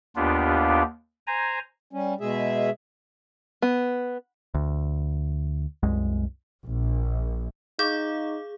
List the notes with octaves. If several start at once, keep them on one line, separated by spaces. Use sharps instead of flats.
D#2 B3 D4 F4 G4
C5 G#5 A#5
G3 C#4
B2 G#3 G#4 E5
B3
D2
C2 F#2 G#3
A#1
D#4 G#4 F5 D6 G6